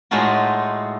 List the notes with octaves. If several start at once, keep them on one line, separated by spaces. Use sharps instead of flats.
A2 G#3 A3 D#4 F4 F#4